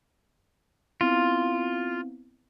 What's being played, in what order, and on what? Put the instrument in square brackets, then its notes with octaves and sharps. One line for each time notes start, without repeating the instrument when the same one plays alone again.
[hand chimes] B3 C4 E4 [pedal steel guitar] F4